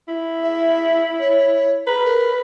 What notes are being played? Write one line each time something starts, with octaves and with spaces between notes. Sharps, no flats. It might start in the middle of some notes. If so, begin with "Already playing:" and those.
E4
E5
C#5
B4 A#5
A#4